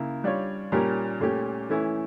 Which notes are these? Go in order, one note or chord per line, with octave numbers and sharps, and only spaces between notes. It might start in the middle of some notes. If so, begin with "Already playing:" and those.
Already playing: C#3 A#3 E4
G3 D4 F4 C#5
A#2 G3 C#4 G4 A#4
A#2 A3 C#4 G4
E3 A3 C#4 E4